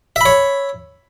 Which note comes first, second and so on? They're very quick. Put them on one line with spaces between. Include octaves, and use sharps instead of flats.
E5 B5 C#5